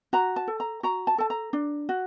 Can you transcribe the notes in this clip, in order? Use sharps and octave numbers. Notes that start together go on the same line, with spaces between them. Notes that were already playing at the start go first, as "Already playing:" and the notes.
F#4 A#5
A5
A4
A#5
F#4 A#5
A5
A4 A5
A#5
D4
F#4